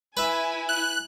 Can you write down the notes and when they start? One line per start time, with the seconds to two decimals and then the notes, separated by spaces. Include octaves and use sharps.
0.17 E4 B4 E5 G#5
0.69 F#6